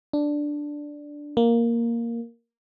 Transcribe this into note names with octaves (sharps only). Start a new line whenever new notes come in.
D4
A#3